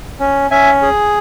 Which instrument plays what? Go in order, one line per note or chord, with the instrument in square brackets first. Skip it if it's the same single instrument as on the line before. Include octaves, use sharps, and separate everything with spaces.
[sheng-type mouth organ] C#4
C#4 E5 G#5
G#4